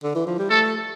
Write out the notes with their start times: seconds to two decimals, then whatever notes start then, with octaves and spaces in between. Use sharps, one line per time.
0.04 D3
0.15 E3
0.27 F3
0.39 G3
0.50 A3 A4